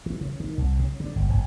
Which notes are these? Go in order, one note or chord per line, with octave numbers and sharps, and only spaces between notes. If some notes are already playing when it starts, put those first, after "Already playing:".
E3
C#3
D#3
C2
C#3
D3
G1
F#1